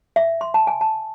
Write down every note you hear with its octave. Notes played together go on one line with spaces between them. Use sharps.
E5
C6
A5
G#5
A5